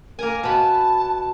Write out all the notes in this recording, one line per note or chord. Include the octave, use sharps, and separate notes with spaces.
A#3 A#4 G#5
B2 A5 B5